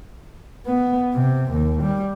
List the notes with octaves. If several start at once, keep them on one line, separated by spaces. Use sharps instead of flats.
B3
C3
D#2
G3